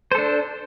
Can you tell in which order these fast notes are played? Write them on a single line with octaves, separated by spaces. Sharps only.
C5 A4 D4